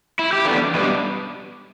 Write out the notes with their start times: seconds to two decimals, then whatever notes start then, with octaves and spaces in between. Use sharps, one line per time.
0.19 E4
0.33 G4
0.45 E2 E3 B3 D4 A4
0.74 B2 G3 B3 D4 B4